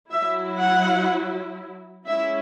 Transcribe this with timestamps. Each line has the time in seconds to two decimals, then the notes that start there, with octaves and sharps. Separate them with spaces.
0.11 F#3 E4 E5
0.60 F#5
2.08 G#3 C#4 E4 E5